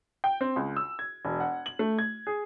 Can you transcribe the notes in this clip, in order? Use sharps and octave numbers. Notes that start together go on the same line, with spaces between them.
G5
C4
C#2
E6
G#6
E1
F#5
F#7
A3
G#6
G#4